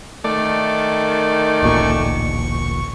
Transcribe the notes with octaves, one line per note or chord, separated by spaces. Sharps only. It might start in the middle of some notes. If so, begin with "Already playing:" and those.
D#3 A3 D5
D1 A1 A#2 C#6